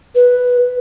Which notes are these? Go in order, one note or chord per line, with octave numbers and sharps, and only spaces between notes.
B4